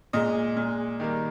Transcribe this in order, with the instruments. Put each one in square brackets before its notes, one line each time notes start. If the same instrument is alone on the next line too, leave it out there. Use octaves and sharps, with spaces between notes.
[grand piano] A#2 G#3 D#5
A#2 G#3
D#3 G3 A#3